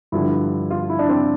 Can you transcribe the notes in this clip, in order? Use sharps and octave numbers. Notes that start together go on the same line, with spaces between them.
G2 D3 F3 E4
F4
E4
D4
C4